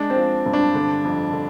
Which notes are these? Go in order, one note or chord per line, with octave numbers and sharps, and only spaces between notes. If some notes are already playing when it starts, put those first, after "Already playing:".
Already playing: G#3 D4
C4
F3
G2
D4
D3
F2
D3